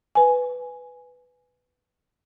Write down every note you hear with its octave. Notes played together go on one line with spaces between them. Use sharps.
B4 G#5